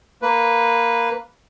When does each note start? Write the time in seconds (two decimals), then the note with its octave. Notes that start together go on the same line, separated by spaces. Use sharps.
0.22 A#3 B4